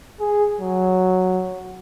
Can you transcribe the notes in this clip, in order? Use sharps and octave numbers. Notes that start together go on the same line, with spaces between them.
G#4
F#3